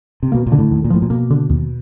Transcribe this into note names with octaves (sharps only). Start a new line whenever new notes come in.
C3
B2 A#3
A#2
D3
A2
D#2
A#2
A2 F3
A#2
B2 A#3
D3
D#2